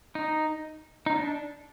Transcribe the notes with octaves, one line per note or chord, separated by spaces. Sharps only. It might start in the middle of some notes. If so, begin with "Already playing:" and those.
D#4
D#4
D4